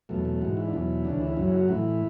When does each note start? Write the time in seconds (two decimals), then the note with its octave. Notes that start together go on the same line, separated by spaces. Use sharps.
0.09 E2 B2 F#3 A3
0.25 A3
0.41 G#2 E3 F#4
0.57 E4
0.67 D4
0.73 E2 B2 F#3 E4
1.05 D2 C#3 E3 D4
1.22 E4
1.37 F#2 C#3 F#3 E4
1.53 F#4
1.68 A2 E3 E4